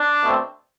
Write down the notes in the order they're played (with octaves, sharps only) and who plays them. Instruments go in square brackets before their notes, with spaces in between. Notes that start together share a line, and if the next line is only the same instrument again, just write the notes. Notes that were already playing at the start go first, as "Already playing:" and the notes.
Already playing: [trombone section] D4
B2 A3 C4